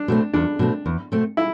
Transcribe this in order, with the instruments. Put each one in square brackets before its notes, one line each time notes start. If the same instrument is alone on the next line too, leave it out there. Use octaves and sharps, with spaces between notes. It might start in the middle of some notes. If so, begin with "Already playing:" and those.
Already playing: [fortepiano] D4
[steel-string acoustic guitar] B2 A3 C4
[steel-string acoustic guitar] E2 [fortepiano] D4
[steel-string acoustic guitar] B2 A3 C4
E2
B2 A3 C4
[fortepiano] E4